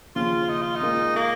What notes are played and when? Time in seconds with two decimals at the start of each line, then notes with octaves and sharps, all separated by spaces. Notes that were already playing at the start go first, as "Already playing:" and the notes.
0.16 D#2 C#3 F3 F4
0.49 D#4
0.61 F4
0.75 D#4
0.82 A#2 G#3 F4 A#4
1.16 A#3